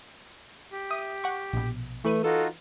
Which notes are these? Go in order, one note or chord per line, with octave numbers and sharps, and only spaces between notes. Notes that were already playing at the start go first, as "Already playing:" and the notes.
G4
E5 D#6 D#7
F#5 C#6
A#1 B2
E3 A3 B4 D#7
D#4 F4 F#4 A4